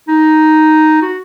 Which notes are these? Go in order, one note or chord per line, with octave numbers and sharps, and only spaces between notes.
D#4
F#4